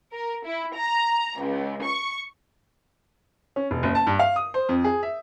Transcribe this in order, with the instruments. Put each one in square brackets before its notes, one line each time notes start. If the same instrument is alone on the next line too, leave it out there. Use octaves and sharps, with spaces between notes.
[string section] A#4
E4
A#5
C#2
C#6
[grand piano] C#4
E1
F#1
A5
G2
F5
D#6
C5
F2
G#4
E5